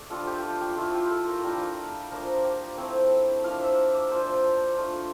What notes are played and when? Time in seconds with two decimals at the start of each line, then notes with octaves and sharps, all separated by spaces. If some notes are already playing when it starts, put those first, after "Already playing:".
Already playing: A3 D5
0.10 G3 D4 F4 A4
0.27 G4
0.43 F4
0.61 G4
0.77 A3 E4 F4
0.94 G4
1.10 A4
1.27 A#4
1.44 G3 D4 F4
2.11 F3 A#3 D4 A#4
2.44 G4
2.77 A3 C4 E4
3.44 F3 A#3 D4 F5
3.62 E5
3.95 D5
4.11 A#3 D4 F4 C5
4.77 A3 D4 F4